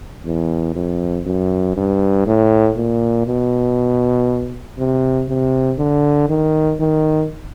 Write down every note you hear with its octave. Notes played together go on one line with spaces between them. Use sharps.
E2
F2
F#2
G2
A2
A#2
B2
C3
C3
D3
D#3
D#3